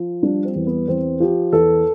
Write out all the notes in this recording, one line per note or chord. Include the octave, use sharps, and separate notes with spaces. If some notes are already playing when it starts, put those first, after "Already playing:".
Already playing: F3
G3 D4
C4
E2
B3
E2 C4
F3 G4
E2 A4